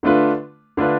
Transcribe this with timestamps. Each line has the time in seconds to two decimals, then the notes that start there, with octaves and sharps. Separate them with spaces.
0.03 D3 A3 D4 F4 B4
0.77 D3 A3 D4 F4 B4